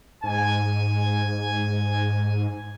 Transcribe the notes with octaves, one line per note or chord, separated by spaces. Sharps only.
G#2 G#5